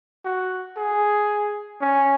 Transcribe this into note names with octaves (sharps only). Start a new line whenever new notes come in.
F#4
G#4
C#4